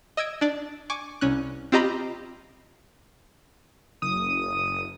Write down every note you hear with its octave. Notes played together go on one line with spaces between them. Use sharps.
D#5 E6 G#6 D7
D4 D5
G#5 C#6 D6
C2 C#4 F#6
C4 F4 G4 D#5 A#5 B5
F#1 D#6